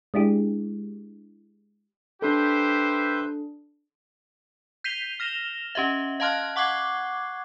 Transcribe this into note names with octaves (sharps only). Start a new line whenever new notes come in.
G#3 D4 E4 G4 G#4
D4 G4 A4 B4 C5 E5 G6
G6 B6 C7 D#7 F7 G7
F6 A#6 E7 F7 G7
C#4 G4 D#5 E5
D#5 F5 A5 C6 F6 F#6
F#5 C#6 D6 F#6 G#6 C7